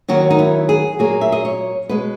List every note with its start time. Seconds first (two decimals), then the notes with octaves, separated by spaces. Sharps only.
0.08 D#2 D#3 F#3 A#3 F#4
0.30 D#4
0.39 E4
0.69 G#4
0.99 A#2 F#3 A#3 G#4
1.21 E5
1.32 D#5
1.45 C#5
1.89 B2 G#3 B4